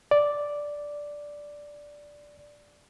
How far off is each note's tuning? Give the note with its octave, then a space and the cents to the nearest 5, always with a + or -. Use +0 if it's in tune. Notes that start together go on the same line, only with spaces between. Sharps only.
D5 -5